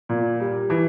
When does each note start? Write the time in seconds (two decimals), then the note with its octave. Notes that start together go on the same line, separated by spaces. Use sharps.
0.09 A#2
0.40 G3
0.70 E3